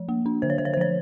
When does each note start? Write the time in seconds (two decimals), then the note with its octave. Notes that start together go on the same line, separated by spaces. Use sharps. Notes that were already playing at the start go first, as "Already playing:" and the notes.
Already playing: F3
0.09 A#3
0.26 D4
0.42 D3 C5
0.50 C#5
0.58 D3 C5
0.65 C#5
0.74 C5
0.77 F3 C#5